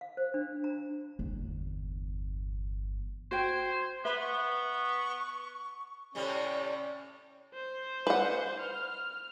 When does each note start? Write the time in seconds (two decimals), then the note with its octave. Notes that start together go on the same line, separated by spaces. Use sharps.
0.01 F5
0.17 C5
0.34 D4
0.64 A#5
1.19 G1 E2
3.31 F#4 C5 G5 G#6
4.05 B3 B4 E5
4.20 C#6
6.15 A2 C3 G3 C#4 D5
7.54 C5
8.07 B4 F#5
8.60 F6